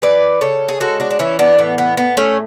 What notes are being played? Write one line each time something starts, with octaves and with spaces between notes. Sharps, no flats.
E3 B4 D5
C#3 A4 C#5
G#4
G#3 F#4 A4
D4 F#4
D4
E3 C#4 E4
B3 D4
A2 B3
B3
A2 B3
A3 C#4